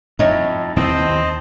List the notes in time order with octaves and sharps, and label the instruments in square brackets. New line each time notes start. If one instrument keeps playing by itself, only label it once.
[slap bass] F2 [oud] D#4 E4 C#5
[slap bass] D#2 D#3 E3 [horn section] C4 [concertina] D#5 A5